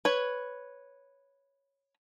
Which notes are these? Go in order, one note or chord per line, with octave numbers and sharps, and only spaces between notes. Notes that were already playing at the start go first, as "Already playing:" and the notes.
B4 C#5